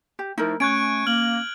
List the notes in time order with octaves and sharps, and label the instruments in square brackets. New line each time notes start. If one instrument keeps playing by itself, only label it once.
[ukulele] G4
[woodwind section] F3 A3 [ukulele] D#4 E4 A#4
[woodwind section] A3 G#5 C#6 [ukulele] C#4 [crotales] F#6 G#6 D7
[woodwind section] A#3 [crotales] F6 F#7